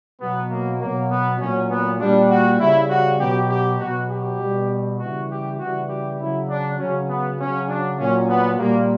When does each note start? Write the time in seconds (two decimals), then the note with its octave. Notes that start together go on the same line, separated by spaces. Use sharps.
0.20 B2 F#3 B3
0.51 A#3
0.81 B2 F#3 A#3
1.11 B3
1.40 A#2 F#3 C#4
1.70 B3
2.00 A#2 G3 D4
2.30 F#4
2.60 C#3 G3 E4
2.90 F#4
3.20 B2 F#3 G4
3.50 G4
3.80 B2 F#3 F#4
4.10 G4
4.40 B2 G3
5.00 C#3 E3 G3 F#4
5.30 G4
5.60 C#3 E3 G3 F#4
5.90 G4
6.19 C#3 F#3 E4
6.49 D4
6.79 C#3 F#3 C#4
7.09 B3
7.39 C#3 F#3 C#4
7.69 D4
7.99 A#2 F#3 C#4
8.29 B3
8.59 A#2 G3 A#3